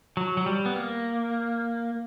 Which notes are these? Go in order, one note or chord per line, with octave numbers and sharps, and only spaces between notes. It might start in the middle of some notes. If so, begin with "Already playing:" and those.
F#3
F#3
G3
B3
A#3